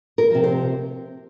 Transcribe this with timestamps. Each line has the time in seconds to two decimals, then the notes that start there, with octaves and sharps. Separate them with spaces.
0.18 A#4
0.30 C3 F3
0.44 C5